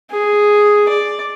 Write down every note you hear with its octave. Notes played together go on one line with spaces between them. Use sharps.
G#4
D5